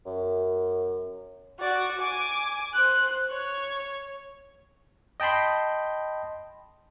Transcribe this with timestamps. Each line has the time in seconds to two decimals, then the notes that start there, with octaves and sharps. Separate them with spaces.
0.06 F#2
1.60 F#4 D5
2.01 G#5 D6
2.74 C5 F#6
3.30 C#5
5.20 D#5 G5 A5 B5 C6